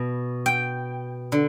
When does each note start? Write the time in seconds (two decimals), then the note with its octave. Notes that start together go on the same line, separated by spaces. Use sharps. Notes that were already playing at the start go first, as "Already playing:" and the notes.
Already playing: B2
0.46 G5
1.32 D3